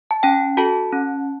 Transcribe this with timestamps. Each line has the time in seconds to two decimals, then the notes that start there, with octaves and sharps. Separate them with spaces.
0.11 A5
0.23 C#4 G5
0.57 F#4 A4 A5
0.93 C#4